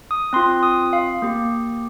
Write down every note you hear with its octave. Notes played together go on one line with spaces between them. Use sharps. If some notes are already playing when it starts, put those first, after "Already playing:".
D#6
C4 F4 C6
D#6
F5
A#3 G4